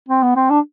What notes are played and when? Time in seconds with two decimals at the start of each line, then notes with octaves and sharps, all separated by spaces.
0.09 C4
0.23 B3
0.36 C4
0.50 D4